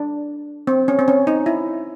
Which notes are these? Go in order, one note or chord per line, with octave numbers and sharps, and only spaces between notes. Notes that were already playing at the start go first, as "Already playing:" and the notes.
Already playing: D4
C4
C#4
C4
C#4
D#4
E4